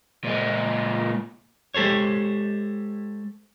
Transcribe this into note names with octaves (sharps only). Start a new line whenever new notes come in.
A#2 G#3
G#3 G4 A4 C5 C#5